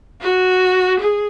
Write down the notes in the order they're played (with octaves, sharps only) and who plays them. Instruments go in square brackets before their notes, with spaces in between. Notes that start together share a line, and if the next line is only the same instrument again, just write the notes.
[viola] F#4
G#4